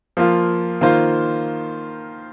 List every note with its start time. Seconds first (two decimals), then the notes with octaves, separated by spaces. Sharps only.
0.17 F3 A#3 F4
0.81 D#3 A#3 F4 C5